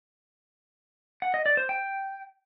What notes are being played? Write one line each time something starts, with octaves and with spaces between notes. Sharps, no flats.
F#5
D#5
D5
C5
G5